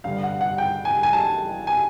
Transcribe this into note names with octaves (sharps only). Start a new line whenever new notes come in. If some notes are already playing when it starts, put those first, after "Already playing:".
G2 D3 G3 F5
F#5
F#5
G5
G#5
G#5
A5
G#5